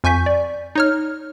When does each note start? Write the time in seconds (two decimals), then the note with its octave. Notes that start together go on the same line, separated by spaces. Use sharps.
0.04 F2 G#5 C#6 G6 B6
0.26 D5
0.75 D#4 C#5 F6